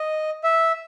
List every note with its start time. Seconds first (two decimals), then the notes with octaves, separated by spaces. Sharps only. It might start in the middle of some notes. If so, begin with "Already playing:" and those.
Already playing: D#5
0.44 E5